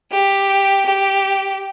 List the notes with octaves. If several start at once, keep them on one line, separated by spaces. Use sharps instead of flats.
G4
G4